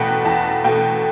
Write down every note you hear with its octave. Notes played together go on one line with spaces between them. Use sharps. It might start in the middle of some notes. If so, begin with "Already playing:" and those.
Already playing: E2 B2 A3 F#5 G5 B5
E2 A5
B2 A3 G5